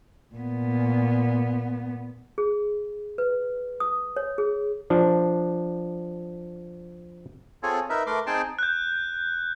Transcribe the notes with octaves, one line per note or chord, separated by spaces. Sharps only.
A#2 B3
G#4
B4
D#6
C#5
G#4
F3 D4
C4 F4 G#4 A4 C#5
D#4 A#4 B4 E5
A3 A#4 B4 C6 D6
C4 D#4 G#4 G5 A5 C6
F#6 G6